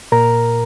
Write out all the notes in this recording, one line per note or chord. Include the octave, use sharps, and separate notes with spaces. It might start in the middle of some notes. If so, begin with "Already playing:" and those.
A#2 A#4 A#5